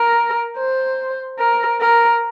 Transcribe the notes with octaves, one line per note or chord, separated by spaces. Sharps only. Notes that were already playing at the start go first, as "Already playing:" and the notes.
Already playing: A#4
C5
A#4
A#4